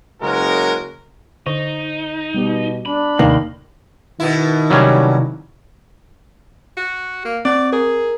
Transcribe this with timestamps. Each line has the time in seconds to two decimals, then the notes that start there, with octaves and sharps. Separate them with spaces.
0.22 F#1 C#3 G#3 F#4 A#4
1.46 D3 D#4 C5 C#6
2.34 B2 G3 B3 G4
2.86 D4 B5
3.19 D#2 C3 D#3 A#3
4.20 B2 D#3 E4
4.70 C3 F#3 G3 C#4
6.77 F#4
7.25 A#3
7.45 C4 D5
7.73 G#4 A#4